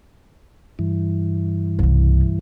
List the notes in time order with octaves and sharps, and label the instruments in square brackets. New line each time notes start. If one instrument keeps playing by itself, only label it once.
[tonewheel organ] G2 E3
[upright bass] C2 C#3